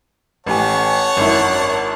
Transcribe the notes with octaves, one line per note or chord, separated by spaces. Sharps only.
A1 G4 C#5 F#5 G#5 A5
G#1 F#2 E4